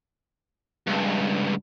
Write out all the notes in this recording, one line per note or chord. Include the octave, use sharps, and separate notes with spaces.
C#2 G2